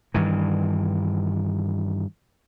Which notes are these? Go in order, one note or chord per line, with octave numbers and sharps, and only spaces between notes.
G2 D#3 E3